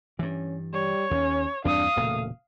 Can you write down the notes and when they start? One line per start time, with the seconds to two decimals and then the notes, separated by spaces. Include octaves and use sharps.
0.19 G2 E3 C#4
0.73 G3 C#5
1.11 D#2 C#4
1.65 E2 G2 C4 D4 F5 D#6
1.97 E1 A#2 C#3 A3